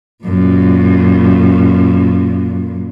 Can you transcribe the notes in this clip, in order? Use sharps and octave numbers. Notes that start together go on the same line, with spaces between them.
F#2 A#2